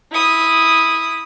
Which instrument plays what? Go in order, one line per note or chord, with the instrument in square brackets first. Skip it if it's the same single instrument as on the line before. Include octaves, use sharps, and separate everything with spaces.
[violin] E4 D#6